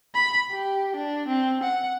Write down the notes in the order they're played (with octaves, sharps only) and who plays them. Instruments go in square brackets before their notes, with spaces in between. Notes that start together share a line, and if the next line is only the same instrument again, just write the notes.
[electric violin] B5
G4
D4
C4
F#5